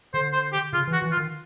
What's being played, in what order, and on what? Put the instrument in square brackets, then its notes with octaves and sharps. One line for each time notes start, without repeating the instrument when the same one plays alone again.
[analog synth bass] D3 [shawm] C5
[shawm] C5
G4
[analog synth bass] C#3 [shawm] F4
[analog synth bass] E3 [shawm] F#4
[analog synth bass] E3
[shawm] F4
[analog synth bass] D#3